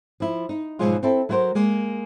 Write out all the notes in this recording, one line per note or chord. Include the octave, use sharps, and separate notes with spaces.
F3 E4
D#4
G#2 B2 F3 F#3 G#3 F4
C4 E4 A4
F#3 E4 F#4 A#4 C5
G#3 A#3